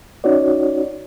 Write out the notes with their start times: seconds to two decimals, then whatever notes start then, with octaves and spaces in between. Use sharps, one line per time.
0.24 C#4 D#4 F#4 C#5 D5